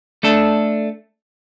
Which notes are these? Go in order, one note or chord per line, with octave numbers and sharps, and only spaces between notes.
A3 D4 A4